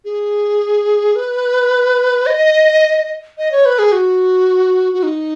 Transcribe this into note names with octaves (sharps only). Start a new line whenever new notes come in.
G#4
B4
D#5
D#5
C#5
B4
G#4
F#4
F#4
D#4